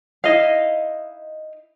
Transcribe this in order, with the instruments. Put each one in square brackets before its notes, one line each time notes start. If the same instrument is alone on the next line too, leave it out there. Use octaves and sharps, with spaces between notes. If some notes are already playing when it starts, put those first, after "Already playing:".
[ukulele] D#4 E4 D#5 F5